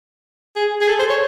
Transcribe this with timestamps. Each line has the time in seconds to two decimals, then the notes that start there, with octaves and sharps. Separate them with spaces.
0.56 G#4
0.81 G#4
0.88 A4
0.99 C5
1.10 C#5